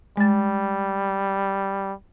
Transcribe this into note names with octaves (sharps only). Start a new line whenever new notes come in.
G3 G#3 A6